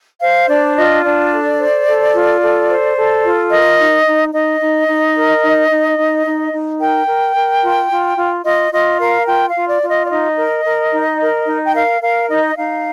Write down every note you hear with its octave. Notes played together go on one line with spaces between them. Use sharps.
C5 F5
D4 D5
F4 D#5
D4 D5
A4
C5
A4
F4
A4
C5
A4
F4
A#4 D#5
D#4
D#4
D#4 D#5
D#4
D#4
A#4
D#4
D#4
D#4
D#4
D#4
A#4 G5
A#4
A#4
F4
F4
F4
F4 D#5
F4 D#5
A#4 F5
F4 G5
F5
F4
D5
F4
D#5
D5
D#4 D#5
A#4
A#4
D#4
A#4
D#4
G5
A#4 F5
A#4 F5
D#4 D#5
D#4 F5